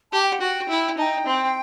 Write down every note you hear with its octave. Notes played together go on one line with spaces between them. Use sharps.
G4 A5
G5
F#5
F#4 G5
E4
D#4 G5 A5
C4